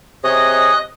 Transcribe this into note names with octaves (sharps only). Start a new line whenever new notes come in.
C3 G#4 C#5 D#5 D#6 F#6